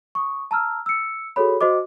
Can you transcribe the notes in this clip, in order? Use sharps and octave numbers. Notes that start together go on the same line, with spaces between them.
C#6 D#6
A5 A#5 E6 F6
E6 C#7
F#4 G#4 A4 C#5 B5
F#4 C5 D#5 D6